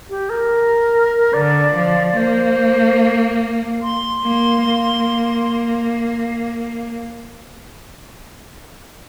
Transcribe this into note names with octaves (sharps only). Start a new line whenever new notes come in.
G4
A#4
D3 D5
F3
A#3 C5
C6
A#3
A#3